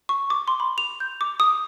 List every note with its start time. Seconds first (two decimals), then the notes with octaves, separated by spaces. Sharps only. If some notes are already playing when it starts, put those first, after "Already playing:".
0.09 C#6
0.30 D6
0.48 C6
0.60 B5
0.78 F7
1.00 G6
1.21 D6
1.40 D#6